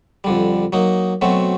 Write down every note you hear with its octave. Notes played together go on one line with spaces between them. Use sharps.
F2 D3 G3
F#3 A#3 D#4
B2 F#3 A3 C4